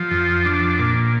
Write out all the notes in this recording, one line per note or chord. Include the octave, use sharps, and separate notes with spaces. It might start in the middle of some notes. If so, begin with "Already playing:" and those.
Already playing: F3
F2
D4
A#2